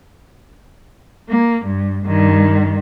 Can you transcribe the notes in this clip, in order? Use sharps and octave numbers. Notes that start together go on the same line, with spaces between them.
A#3
G2
G2 D#3